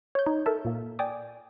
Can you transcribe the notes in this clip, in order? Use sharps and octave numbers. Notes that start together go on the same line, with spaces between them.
C#5 G6
D#4
A4 A#4 E5 A5
A#2 A#3
D5 G5 G#5 D6 D#6